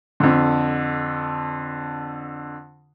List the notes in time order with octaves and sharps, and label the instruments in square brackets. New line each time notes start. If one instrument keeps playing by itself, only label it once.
[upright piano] F2 D3